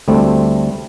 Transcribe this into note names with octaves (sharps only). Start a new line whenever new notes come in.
D2 G3 A3 C4